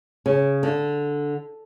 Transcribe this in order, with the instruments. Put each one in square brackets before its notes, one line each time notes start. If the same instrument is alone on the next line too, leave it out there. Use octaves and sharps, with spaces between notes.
[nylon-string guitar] C#3
D3